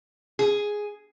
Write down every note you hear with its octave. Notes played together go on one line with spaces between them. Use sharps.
G#4